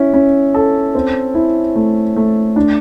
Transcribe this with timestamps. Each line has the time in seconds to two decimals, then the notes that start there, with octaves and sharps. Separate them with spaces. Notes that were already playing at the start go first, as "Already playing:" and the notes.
Already playing: C#4 E4
0.14 C#4
0.54 A4
0.95 C4
1.34 E4
1.76 A3
2.16 A3
2.56 D4